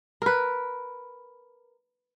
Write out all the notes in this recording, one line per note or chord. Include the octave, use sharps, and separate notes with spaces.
A#4 B4